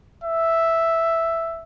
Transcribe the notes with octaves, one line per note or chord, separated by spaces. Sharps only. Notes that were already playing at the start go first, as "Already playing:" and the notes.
E5